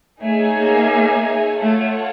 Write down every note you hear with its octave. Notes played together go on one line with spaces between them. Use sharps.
A3 D#4 G#4 C#5 E5 G#5
A#3
A3 F4 A4 C#5 F#5 A5